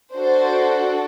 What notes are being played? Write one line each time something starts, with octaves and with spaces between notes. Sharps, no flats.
D4 F#4 A4 C5